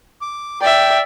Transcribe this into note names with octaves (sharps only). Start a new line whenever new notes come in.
D6
D5 E5 G5